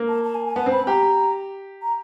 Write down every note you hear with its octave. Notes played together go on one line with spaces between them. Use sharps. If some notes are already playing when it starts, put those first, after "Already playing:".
Already playing: A#3
A5
A5
G#5
G#5
B3 A5
C4
B5
G4 A#5
A#5